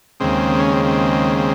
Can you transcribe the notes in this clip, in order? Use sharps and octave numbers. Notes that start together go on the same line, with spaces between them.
D#2 C#3 G#3 C4
C#4
C4
C4
C4